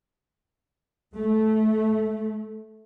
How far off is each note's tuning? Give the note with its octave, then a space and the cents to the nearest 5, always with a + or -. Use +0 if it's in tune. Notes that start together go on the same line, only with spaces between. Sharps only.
A3 -15